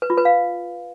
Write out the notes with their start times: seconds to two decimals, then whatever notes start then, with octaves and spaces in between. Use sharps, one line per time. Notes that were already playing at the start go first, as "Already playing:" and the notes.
0.02 B4
0.10 F4
0.18 B4
0.25 F5